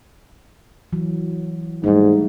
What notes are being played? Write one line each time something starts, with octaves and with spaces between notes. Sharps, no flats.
E3 F#3
G#2 G3 A3 D#4